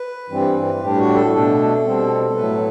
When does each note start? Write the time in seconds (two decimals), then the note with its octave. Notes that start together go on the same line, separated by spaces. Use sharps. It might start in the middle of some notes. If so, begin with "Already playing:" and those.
Already playing: B4
0.29 G2 E3 G3 C4
0.80 A2 G3 D4 G4
0.98 F#4
1.15 A4
1.33 B2 A3 D4
1.85 B2 G3 C4
2.36 A2 F#3 A3 B4